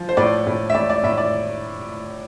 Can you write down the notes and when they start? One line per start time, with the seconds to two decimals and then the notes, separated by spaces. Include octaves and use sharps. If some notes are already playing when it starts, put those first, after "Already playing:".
Already playing: F3
0.09 C5
0.17 A2 D5
0.47 A2
0.70 E5
0.74 A2 D5
0.90 D5
1.03 A2 E5
1.18 D5